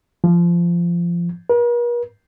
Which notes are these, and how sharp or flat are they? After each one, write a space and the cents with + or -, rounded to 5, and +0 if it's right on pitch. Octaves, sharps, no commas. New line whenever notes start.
F3 -20
A#4 +45